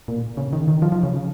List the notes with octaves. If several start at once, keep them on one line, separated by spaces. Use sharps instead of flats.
A#2
C#3
D#3
D#3
F3
F3
C#3